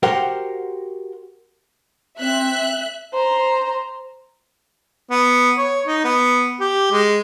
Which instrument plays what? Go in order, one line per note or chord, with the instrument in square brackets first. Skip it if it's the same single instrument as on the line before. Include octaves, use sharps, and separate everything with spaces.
[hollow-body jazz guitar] F#4 G4 A#4 C5 F#5 G5
[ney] C4 [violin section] E5 F#6
[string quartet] C5 A#5
[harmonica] B3
C#5
D#4
B3
G4
G#3